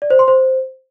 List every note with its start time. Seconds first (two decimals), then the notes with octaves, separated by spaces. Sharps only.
0.02 D5
0.10 C5
0.19 C6
0.28 C5